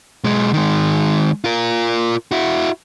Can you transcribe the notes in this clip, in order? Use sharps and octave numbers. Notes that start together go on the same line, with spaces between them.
B1 G#3
D#3 G#3
F4 A#4
E4 F#4